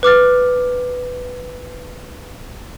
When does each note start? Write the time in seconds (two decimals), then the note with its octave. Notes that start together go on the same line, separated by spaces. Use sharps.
0.03 B4 D6 F6 A6